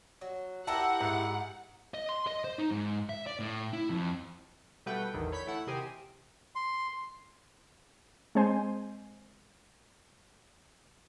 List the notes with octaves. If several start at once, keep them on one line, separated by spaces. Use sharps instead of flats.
F#3
E4 G4 A#4 F#5 A5
G#2
D#5
C6
D#5
C5
D#4
G#2
E5
D5
A2
E4
F2
B2 G3 A3 B4 F#5 G5
A1 E2 D3 D#3
C#5 B5 G6 B6
A3 E4 F#5
C3 D#3 C4 G4 D#5 G#5
C6
G#3 C4 C5 G#5